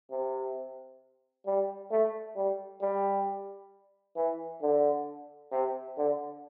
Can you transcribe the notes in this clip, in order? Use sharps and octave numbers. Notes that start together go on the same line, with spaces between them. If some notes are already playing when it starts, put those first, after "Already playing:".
C3
G3
A3
G3
G3
E3
D3
C3
D3